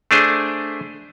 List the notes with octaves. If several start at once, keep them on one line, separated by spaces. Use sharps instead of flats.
A3 D4 G#4 C5